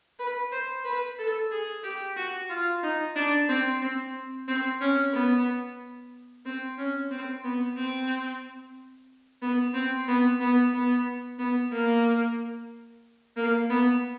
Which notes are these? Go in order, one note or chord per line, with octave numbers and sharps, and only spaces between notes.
B4
C5
B4
A4
G#4
G4
F#4
F4
D#4
D4
C4
C4
C4
C#4
B3
C4
C#4
C4
B3
C4
B3
C4
B3
B3
B3
B3
A#3
A#3
B3